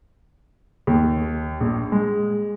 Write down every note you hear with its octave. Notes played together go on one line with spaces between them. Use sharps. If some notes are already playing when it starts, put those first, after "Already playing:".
D#2
A#1
G#3